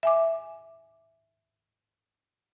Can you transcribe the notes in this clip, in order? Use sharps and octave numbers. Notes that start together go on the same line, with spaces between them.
E5 G#5 D6